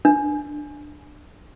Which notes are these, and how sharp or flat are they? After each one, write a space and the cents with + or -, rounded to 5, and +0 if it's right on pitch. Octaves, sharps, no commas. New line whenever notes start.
D4 +10